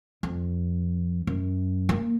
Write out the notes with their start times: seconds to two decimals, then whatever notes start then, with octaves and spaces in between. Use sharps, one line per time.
0.23 F2
1.27 F#2
1.89 A#3